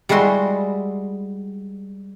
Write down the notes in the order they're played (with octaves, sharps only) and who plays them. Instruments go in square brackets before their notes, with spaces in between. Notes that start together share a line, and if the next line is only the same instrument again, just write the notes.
[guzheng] G3 G#3 E4 F#4 C6